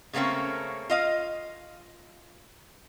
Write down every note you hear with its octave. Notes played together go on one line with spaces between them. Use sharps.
C#3 A3 A#3 C4 C#4
F4 D#5 F5